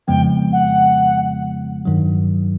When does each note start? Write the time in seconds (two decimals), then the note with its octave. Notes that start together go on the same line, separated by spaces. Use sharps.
0.08 F2 C#3 F3 G#3 B3 G5
0.52 F#5
1.85 G2 D#3 F#3